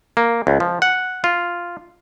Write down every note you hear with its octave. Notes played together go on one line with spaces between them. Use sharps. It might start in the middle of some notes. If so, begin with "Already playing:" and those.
A#3
C#2
F3
F#5
F4